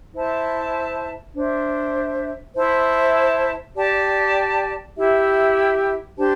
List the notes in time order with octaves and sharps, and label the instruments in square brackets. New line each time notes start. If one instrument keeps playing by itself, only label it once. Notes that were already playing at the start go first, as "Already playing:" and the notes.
[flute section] E4 C5 E5 A5
D4 C5 E5
E4 C5 E5 A5
G4 D5 A5
E4 G4 E5
D4 G4 C5 A5